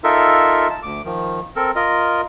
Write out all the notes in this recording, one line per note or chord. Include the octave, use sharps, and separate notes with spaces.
D#4 F4 A4 A#4 E5
A5
D2 D6
D#3 F3
C4 A4 A#4
F4 A#4 D#5